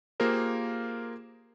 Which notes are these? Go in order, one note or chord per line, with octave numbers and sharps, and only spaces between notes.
A#3 F4 G4 G#4 A#4 C5